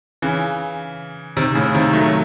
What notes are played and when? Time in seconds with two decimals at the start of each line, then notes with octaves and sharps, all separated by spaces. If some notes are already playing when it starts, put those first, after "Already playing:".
0.22 C#3 E3
1.37 C3 D#3
1.55 A2 C#3
1.74 C3 D#3
1.93 F#3 A3